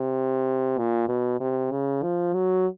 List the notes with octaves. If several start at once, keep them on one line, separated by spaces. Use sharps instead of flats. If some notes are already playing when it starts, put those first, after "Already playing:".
Already playing: C3
A#2
B2
C3
C#3
F3
F#3